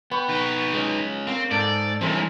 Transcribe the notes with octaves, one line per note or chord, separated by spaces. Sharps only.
B3 G5 B5 C#6
D#4 B4
G#3 C#4
A#3 C4
G#2 A4 D5
G2 E3 G#3 C4 C#4 A#4